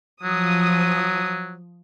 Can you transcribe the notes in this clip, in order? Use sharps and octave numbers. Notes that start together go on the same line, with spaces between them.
F3 F#3 D#6